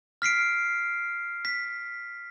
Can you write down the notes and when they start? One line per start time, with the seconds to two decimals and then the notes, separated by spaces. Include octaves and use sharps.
0.22 F6 B6 C7 D7
1.45 B6